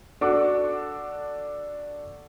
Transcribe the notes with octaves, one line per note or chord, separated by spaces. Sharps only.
D4 F#4 A4 D6